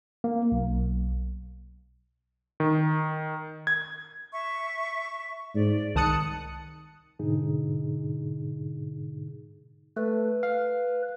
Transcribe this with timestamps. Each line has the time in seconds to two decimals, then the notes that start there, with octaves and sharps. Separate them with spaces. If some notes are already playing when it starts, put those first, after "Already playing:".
0.24 A#3
0.52 B1
2.60 D#3
3.67 G#6
4.33 E5 C#6
5.55 G#2 D5
5.95 C2 D#3 A5 D#6 F#6 C#7
7.19 G#2 B2 D3 D#4 G#4
9.97 A3 B4
10.43 F5